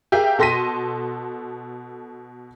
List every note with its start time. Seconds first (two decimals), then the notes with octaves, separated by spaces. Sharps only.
0.12 G4 G#4 A#4 E5 F5 G5
0.39 B2 A4 C6 A#6 B6 D#7